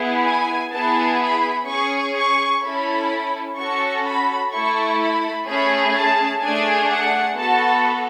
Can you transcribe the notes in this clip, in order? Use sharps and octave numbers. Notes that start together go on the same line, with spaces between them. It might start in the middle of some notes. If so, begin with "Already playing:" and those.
Already playing: B3 E4 G#4
G#5
B3 E4 G#4 A5
B5
C#4 G#4 C#6
C#6
C#4 E4 A4 B5
C#4 F#4 A4 C#6
B5
A3 E4 A4 C#6
B5
A3 C#4 G#4 B5
A5
A3 D4 G#4 G#5
F#5
B3 F#4 A4 A5